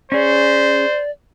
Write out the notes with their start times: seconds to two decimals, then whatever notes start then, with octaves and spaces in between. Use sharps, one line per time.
0.12 C#4 G#4 C5 D5